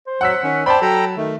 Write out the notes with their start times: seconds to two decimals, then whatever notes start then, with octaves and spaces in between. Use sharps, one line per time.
0.07 C5
0.21 F#3 F#5 E6 B6
0.43 D#3 C#4
0.66 C5 D5 G5 A5 B5
0.82 F#3 A4 G5 A#5
1.17 D#3 A3